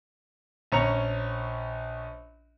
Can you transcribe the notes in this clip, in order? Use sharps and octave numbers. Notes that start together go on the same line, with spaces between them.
A#1 C#4 A#5 C#7 F7